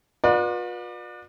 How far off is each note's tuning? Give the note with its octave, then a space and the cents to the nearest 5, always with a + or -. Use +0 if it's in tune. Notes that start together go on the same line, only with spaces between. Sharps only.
F4 +45 B4 -30 D5 +30